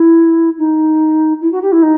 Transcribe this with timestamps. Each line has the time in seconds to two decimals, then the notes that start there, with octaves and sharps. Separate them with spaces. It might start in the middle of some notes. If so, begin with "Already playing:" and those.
Already playing: E4
0.58 D#4
1.41 E4
1.52 F#4
1.62 G4
1.72 E4
1.82 D#4